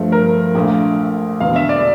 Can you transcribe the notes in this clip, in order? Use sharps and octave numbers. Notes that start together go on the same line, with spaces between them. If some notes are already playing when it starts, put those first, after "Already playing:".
Already playing: G2 F3 A3
A#4
A#1 A#2 A3
E1 E2 D3 F5
E5
D5